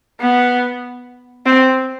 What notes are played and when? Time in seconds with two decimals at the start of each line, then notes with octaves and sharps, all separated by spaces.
0.20 B3
1.46 C4